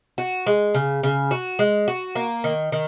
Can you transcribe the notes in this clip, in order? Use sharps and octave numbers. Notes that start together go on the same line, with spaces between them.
F#4
G#3
C#3
C#3
F#4
G#3
F#4
A#3
D#3
D#3